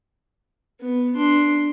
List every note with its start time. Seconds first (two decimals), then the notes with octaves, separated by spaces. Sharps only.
0.80 B3
1.16 D4 C6